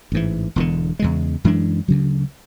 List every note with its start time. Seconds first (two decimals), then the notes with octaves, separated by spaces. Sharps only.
0.12 A1 G#2 E3
0.56 E1 E2 D3
0.99 E2 C#3 G#3
1.44 F#2 E3 G#3 D4
1.88 D2 C#3 F#3